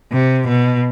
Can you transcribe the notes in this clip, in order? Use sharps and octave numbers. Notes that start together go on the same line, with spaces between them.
C3
B2